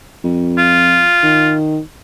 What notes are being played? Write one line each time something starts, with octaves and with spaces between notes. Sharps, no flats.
F2
F4
D#3